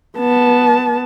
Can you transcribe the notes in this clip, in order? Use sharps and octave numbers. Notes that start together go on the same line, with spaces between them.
B3 A5